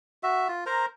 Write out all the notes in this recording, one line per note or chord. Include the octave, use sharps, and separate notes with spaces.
F#4 E5
F4
A#4 C5 A#5